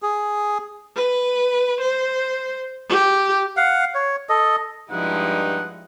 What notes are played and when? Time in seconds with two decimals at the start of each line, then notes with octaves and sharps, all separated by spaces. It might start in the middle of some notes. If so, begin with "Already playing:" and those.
0.02 G#4
0.96 B4
1.81 C5
2.89 G4
3.57 F5 F#5
3.95 C#5
4.29 A4 D#5
4.91 G2 F3 G#3 D#4 E4 F#5